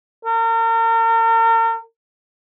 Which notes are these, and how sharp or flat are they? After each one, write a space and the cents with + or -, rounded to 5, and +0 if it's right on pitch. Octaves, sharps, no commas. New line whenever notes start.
A#4 -40